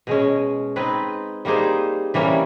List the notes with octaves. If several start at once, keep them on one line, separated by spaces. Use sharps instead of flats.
B2 G#3 C#4
C4 D#4 G#4 B4
G3 A#3 D#4 G#4 C5
C3 E3 G3 A#3 C#4